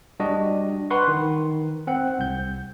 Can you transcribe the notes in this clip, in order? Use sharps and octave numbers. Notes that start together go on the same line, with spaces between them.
G3 D4 F#4 D#5
B4 F#5 C6 C#6
D#3
C4 F#5
C2 G6